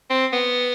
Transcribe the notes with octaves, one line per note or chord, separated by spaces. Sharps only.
C4
B3